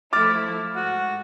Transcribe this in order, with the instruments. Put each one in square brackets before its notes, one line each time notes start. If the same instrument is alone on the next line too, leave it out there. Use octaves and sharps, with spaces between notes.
[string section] F3 A3 E4 [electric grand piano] D6 F6 A6
[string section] G#2 [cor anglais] F#4